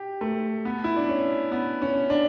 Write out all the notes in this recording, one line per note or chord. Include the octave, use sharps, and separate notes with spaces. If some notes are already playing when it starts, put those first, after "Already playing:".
Already playing: G4
A3
B3
E4
D4
C#4
B3
C#4
D4